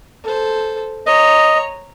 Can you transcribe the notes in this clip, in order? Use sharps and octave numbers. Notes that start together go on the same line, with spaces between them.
A4 C5
C#5 D#5 A#5